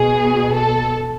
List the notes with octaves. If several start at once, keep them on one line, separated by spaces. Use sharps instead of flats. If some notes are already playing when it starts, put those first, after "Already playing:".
Already playing: B2 G#4
A4